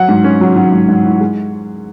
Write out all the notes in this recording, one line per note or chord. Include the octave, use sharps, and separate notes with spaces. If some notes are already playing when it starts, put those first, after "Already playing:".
Already playing: F#3 F#5
G#2
C#4
F#3
F#3
G#2
G#2
E4
G#3